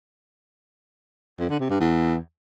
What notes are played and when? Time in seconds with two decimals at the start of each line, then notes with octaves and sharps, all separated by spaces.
1.39 F2
1.49 D3
1.60 C3
1.70 G2
1.80 E2